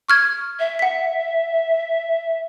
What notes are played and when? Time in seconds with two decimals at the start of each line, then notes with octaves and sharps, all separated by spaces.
0.09 C#6 F6 G#6
0.59 E5
0.79 F#5 B6